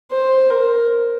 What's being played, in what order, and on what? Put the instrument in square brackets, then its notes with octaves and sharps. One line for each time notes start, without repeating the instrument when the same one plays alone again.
[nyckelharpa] C5
A#4